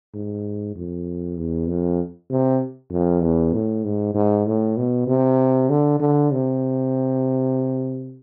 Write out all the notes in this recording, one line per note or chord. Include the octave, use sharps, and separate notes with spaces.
G#2
F2
E2
F2
C3
F2
E2
A2
G#2
G#2
A2
B2
C3
D3
D3
C3